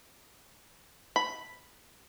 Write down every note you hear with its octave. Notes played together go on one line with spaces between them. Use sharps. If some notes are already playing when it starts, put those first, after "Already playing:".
B5